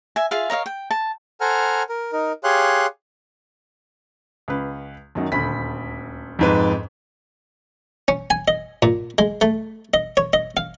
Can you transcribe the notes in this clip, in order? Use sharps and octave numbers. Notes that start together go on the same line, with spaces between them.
E5 G#5
F4 G#4 E5 F5
A#4 C#5 D#5 F5
G5
A5
A4 C5 F#5 G#5 A#5 F6
A#4
D#4 A#4
G4 G#4 C#5 F5 C6 F#6
C#2 B4
F#2 D#3 F#3
D#1 D2 B5 B6
F2 G#2 B4
C#4
G#5
D#5
A#2
G#3
A3
D#5
C#5
D#5
F5